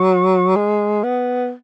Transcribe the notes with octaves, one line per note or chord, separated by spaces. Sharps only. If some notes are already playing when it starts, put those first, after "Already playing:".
Already playing: F#3
G#3
B3